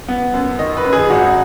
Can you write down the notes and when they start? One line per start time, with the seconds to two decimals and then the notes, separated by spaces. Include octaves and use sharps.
0.08 B3
0.34 F#2
0.59 D#3 D#5
0.77 B4
0.84 F#2
0.93 G#4
1.10 G#1 F#4